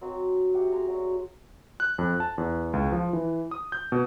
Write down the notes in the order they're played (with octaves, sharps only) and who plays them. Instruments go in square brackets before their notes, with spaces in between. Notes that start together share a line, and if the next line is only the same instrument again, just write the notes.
[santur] F#3 C4 D#5
G4 G#4 E5 F#5
F#4 G#4 A#5 C6
F#3 D5
[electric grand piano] F#6
F2
A5
E2
C#2
F3
E3
D#6
G6
B2